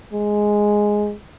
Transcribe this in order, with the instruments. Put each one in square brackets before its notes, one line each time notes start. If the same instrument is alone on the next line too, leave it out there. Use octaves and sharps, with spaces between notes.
[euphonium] G#3